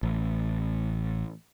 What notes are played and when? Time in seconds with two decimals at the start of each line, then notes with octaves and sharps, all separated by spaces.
0.03 A1